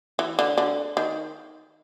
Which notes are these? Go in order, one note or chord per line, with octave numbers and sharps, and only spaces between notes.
E3
D3
D3
D#3